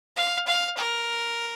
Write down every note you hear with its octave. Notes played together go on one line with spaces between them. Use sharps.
F5
F5
A#4